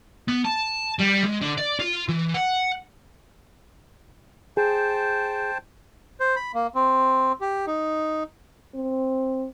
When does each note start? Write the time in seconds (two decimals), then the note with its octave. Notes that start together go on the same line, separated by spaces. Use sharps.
0.28 B3
0.45 A5
0.99 G3
1.23 G#3
1.41 D3
1.58 D5
1.79 F4
2.09 E3
2.34 F#5
4.57 G#4 C5 G5 A5
6.20 C5
6.36 B5
6.54 A#3
6.75 C4
7.41 G4
7.67 D#4
8.75 C4